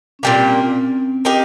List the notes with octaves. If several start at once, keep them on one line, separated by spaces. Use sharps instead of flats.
C#4
A#2 G3 A#3 C4
C4
C#4
C4
C4
A#3 D#4 G4